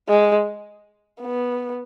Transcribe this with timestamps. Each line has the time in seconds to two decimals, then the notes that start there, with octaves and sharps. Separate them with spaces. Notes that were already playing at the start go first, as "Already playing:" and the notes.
0.09 G#3
1.21 B3